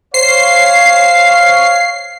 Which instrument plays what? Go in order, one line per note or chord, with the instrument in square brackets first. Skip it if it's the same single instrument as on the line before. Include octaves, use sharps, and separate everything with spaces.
[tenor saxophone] C5 [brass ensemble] C#5 F5 [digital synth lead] C7